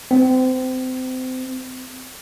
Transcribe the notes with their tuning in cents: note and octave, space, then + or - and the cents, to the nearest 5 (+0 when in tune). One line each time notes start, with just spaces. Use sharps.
C4 -30